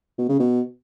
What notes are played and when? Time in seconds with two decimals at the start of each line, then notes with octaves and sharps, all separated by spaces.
0.18 B2
0.29 C#3
0.40 B2